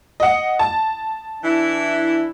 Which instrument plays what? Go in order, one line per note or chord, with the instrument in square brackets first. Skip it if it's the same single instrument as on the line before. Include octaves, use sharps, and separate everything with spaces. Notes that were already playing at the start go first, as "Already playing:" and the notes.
[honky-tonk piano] D#5 F#5
A5
[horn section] E3 D4 E4